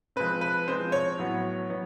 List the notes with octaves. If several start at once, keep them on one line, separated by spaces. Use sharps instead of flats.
F3 G#3 C4 B4
B4
F3 G#3 C4 C5
C#5
A2 F#3 B3
F#3 B3